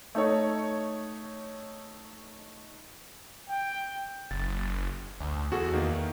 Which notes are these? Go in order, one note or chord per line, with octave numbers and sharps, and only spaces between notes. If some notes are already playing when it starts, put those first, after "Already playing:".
A3 D#4 A4 C#5
G5
F#1 A6
D2
E2 F#4 G#4 A4
D#3 A#3